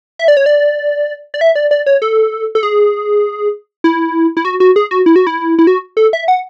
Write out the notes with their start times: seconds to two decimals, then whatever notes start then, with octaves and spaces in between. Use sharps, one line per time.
0.19 E5
0.28 D5
0.37 C#5
0.46 D5
1.34 D5
1.41 E5
1.55 D5
1.71 D5
1.86 C#5
2.02 A4
2.55 A4
2.63 G#4
3.84 E4
4.37 E4
4.45 F#4
4.60 F#4
4.76 G#4
4.91 F#4
5.06 E4
5.16 F#4
5.27 E4
5.59 E4
5.67 F#4
5.97 A4
6.13 E5
6.28 F#5